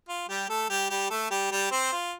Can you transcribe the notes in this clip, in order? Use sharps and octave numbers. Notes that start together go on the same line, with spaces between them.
F4
G3 G4
A3 A4
G3 G4
G3 G4
A3 A4
G3 G4
G3 G4
C4 C5
F4